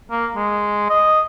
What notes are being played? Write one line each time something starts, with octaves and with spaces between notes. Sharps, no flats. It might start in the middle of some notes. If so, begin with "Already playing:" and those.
A#3
G#3
D#5